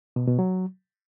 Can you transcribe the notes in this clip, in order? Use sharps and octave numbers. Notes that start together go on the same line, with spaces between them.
B2
B2
F#3